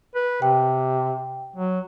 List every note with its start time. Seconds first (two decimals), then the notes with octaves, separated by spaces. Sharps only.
0.15 B4
0.42 C3 G5
1.56 F#3